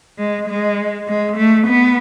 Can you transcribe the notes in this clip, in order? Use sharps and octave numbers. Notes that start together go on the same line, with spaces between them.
G#3
G#3
G#3
A3
B3